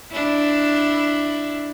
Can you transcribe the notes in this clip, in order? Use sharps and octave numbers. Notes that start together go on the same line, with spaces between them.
D4 E4